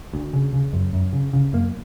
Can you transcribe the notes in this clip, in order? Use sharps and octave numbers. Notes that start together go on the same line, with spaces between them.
D2
C#3
C#3
F#2
F#2
C#3
C#3
F#2 A#3